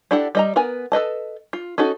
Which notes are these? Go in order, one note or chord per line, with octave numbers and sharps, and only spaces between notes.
D4 E4 G4 A4 F#5
G3 D#5 A#5
B3 A#4 B4 G#5
A4 B4 D#5 A5
F4
C#4 D#4 F#4 A4